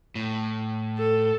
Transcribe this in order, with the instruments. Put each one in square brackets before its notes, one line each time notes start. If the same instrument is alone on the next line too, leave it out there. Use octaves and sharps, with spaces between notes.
[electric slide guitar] A2
[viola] A4